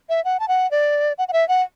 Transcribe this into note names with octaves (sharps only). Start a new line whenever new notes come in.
E5
F#5
A5
F#5
D5
F#5
F#5
E5
F#5